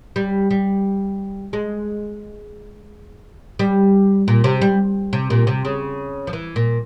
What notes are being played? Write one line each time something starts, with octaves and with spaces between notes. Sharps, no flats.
G3
G3
G#3
G3
A#2
C3
G3
C3
A#2
C3
C#3
F3
E3
A#2